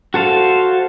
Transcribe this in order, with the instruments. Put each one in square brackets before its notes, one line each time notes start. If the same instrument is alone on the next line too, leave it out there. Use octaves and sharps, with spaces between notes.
[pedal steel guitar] F#4 A4 C5 F5